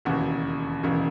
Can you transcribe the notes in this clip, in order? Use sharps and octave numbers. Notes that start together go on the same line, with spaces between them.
E1 D#2 C#3 E3 F#4
E1 D#2 C#3 E3